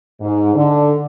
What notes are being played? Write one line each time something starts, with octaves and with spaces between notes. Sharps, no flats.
G#2
D3